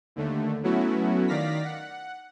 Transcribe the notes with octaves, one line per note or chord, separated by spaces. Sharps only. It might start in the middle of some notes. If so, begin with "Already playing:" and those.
D#2 D3 A3
F#3 A3 B3 C#4 E4 F#4
D#3 D5 F5 A#6 B6
F#5